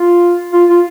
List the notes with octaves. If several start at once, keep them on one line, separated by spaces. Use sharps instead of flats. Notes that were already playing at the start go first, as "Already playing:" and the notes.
Already playing: F4
F4
F4